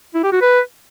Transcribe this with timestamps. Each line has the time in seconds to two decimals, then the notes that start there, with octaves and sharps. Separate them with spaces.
0.14 E4
0.23 G4
0.33 F#4
0.42 B4